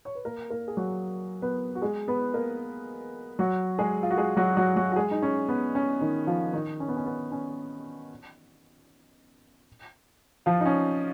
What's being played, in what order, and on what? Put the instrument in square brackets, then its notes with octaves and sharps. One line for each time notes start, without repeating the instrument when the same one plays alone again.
[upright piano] C#5
B4
A#3 A#4
A#3 A#4
G#4
F#3 F#4
B3 B4
F#4
G#3 G#4
B3 B4
A#3 A#4
F#3 F#4
G#3 G#4
F4
F#4
G#3 G#4
F#3 F#4
F#3 F#4
F#3 F#4
F#4
G#3 G#4
D#4
C#4
B3
C#4
D#3 D#4
F3 F4
D#3 D#4
C#4
B3
C#4
B3
C#4
F3 F4
D#4
C#4